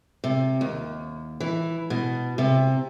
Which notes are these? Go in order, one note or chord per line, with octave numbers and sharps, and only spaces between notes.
C3
D#2
E3
B2
C3